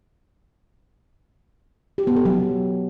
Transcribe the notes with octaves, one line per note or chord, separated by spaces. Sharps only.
G4
B3
A4
F#3